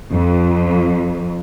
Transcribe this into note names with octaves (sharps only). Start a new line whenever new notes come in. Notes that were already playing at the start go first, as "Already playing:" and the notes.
F2